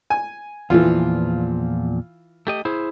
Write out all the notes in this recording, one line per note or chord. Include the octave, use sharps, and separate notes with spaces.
G#5
E2 A#2 E3 F3 F4
A3 G4 D#5
E4 G#4 C5